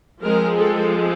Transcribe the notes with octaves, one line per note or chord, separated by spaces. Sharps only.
F3 G#3 C4 A#4
A4